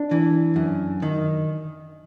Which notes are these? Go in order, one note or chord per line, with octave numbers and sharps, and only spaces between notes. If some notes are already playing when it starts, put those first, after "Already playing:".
Already playing: D4
E3
F#2
D#3